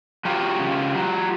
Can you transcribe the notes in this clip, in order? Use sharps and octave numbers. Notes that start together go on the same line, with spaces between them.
F#3 F4 G4
C#3
F#3